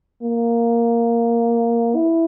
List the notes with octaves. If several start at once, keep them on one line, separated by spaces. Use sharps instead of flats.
A#3
E4